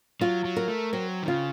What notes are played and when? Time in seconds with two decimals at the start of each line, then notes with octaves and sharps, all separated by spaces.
0.21 F#3 F4
0.45 F#3
0.57 A#4
0.68 A3
0.93 F#3 C4
1.23 D#3
1.28 C#3 F4